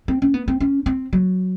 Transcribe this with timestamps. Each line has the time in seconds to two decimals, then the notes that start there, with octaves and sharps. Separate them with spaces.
0.08 C4
0.22 C#4
0.34 B3
0.48 C4
0.60 C#4
0.86 C4
1.13 F#3